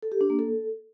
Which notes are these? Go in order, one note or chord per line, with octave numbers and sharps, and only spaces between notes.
A4
G4
D4
A#3
A4